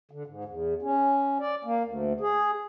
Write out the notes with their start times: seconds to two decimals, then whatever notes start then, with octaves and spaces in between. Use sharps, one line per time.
0.11 D3
0.26 G#2
0.44 E2
0.82 C#4
1.40 D5
1.64 A#3
1.84 D2
2.20 G#4